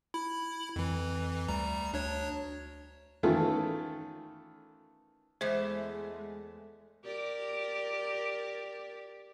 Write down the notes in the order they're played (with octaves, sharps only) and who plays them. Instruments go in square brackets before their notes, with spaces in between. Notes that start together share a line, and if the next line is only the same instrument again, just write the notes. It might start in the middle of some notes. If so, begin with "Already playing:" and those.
[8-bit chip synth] E4 B5
F2 E3
D2 G3 A#5
D2 D4 C#5
[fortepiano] D#3 E3 A3 C#4 F4 A4
[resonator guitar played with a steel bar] E2 A3 [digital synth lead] G#3 [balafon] C5
[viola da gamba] G4 A#4 D5